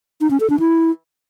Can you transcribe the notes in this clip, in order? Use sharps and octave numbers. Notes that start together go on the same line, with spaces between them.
D#4
C#4
A4
D4
E4